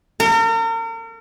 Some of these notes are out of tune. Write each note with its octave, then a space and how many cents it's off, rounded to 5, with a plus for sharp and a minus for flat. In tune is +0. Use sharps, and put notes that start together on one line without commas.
A#4 -40